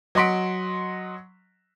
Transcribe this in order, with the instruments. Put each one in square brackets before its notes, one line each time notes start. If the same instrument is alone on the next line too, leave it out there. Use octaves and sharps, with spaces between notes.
[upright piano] F#3 D#5 F#5 C6 B6 D7